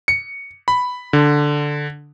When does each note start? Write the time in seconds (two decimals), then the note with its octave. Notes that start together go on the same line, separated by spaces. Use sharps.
0.08 C#7
0.68 B5
1.13 D3